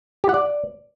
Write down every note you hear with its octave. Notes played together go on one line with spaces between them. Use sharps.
G4
F#5
D5